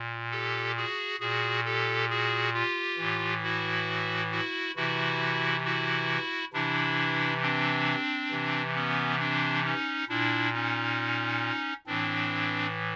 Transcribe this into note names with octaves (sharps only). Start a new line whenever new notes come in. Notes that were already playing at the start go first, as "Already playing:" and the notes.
Already playing: A#2
G4 A4
F#4 G#4
A#2 F#4 G#4
G4 A4
F#4 G#4
F4 G4
A2 E3
E4 F#4
E4 F#4
C3 E3 E4 F#4
E4 F#4
C3 E3 D4 E4
C4 D4
C3 E3
B3 C#4
C4 D4
C#4 D#4
A#2 D4 E4
C#4 D#4
A2 E3 C4 D4